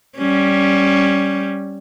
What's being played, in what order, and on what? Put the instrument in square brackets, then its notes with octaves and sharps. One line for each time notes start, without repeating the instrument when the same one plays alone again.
[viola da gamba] G3 C#4